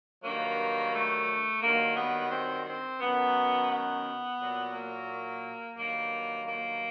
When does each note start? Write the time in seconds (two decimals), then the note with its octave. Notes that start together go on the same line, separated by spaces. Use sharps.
0.24 G2 D#3 F#3 A#3
0.93 A3
1.62 G2 D#3 F#3 A#3
1.97 B3
2.31 C4
2.65 C4
3.00 F#2 D#3 F#3 B3
3.69 B3
4.38 A#2 F#3
4.73 A#3
5.76 G2 D#3 F#3 A#3
6.45 A#3